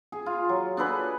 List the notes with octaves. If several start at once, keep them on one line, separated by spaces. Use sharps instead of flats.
G#4
F4
F#3
D4 G#4 A4 B4